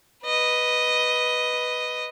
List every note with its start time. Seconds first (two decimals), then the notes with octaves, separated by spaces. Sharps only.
0.24 B4 D#5